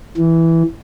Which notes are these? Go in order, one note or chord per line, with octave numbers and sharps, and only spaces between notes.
E3